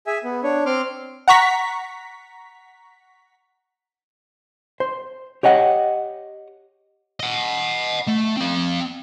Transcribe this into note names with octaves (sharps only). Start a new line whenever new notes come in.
G#4 E5 G#5
B3
D4 C#5
C4 C6 D6 F6
F#5 A#5 C#6 B6
C5
G4 C#5 D#5 F#5
D#5 F#5
A3
C4 F5